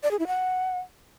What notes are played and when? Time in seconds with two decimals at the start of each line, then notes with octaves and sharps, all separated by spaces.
0.03 D5
0.11 G#4
0.19 E4
0.27 F#5